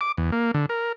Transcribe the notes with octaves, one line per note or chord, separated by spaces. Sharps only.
D6
E2
A#3
D3
A#4